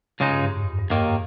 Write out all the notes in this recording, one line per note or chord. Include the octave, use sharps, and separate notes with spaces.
C#2 C#3 G#3 D#4
G2
G#2
G2
F2
G2
G2
D#2 G#2 D#3 A#3